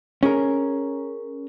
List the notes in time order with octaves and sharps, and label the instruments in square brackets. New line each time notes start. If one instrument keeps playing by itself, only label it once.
[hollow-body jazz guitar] C#4 G#4 A#4